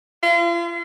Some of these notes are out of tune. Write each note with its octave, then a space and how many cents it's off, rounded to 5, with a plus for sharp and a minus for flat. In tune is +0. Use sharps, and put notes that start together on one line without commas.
F4 -40